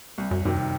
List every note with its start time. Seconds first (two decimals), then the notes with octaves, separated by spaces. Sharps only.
0.18 C2
0.31 F#2
0.45 F#2 C3 D#3